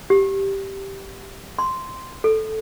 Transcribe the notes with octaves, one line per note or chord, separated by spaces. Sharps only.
G4
C6
A4